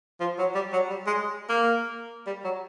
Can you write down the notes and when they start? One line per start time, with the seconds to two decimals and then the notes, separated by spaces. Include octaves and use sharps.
0.20 F3
0.39 F#3
0.55 G3
0.73 F#3
0.90 G3
1.07 G#3
1.49 A#3
2.27 G3
2.44 F#3